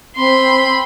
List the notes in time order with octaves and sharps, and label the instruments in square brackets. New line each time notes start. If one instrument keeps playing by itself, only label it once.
[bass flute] C4 [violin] B5 C6